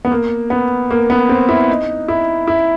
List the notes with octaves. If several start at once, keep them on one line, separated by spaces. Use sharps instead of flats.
B3
A#3
B3
A#3
B3
C4
E4
D#4
E4
E4